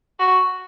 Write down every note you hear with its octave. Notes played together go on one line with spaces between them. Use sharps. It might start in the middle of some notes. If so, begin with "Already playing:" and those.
F#4